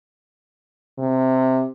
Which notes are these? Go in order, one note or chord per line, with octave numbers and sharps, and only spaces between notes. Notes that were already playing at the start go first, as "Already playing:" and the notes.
C3